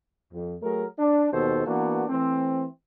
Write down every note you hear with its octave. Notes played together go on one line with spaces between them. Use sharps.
F2
F#3 A3 G#4 A#4
D4
D#2 B2 D#3 A4 C5
E3 A#3 B3 D4 F#4
E3 A3 C4